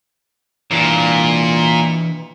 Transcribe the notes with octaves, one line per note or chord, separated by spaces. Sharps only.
A#2 E3 D4